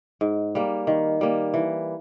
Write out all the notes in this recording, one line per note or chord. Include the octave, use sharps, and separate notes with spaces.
G#2
G3 A#3
D#3
G3 A#3
E3